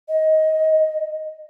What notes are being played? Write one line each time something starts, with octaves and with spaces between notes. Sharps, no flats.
D#5